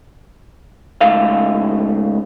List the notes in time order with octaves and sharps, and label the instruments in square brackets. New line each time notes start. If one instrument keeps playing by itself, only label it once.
[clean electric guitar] C#2 G#2 A3 F5